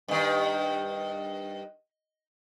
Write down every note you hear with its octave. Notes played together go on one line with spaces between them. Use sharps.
G2 D#3